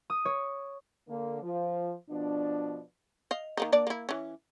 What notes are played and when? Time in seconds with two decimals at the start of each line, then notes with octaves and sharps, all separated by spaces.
0.10 D#6
0.25 C#5
1.09 D3 A#3
1.43 F3
2.10 B2 F3 B3 D4
3.31 D#5 F5
3.57 D#3 A#3 D#4
3.72 A#3 D4 D5
3.87 A#3 E4
4.09 E3 C#4